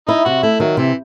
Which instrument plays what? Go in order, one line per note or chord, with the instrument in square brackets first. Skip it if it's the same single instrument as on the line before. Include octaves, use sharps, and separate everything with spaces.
[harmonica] D#4 [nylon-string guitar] E4
[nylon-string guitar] C3 [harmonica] F#4
[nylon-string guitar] A3 [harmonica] E4
[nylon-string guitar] D#3 [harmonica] F#3
[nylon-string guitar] C3 [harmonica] E3